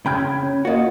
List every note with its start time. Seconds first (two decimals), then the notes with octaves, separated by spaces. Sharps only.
0.06 C#3 G5 B5 G#6
0.43 C#4
0.65 A#3 F4 F#4 D#5